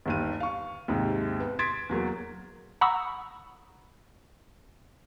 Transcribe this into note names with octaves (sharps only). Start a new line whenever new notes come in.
G1 D#2 D#7
F5 C#6
D#2 G#2 C3
B3
C6 G#6 A6 B6 D7
E2 F#3 A#3
F#5 A#5 B5 C#6 D#6 E6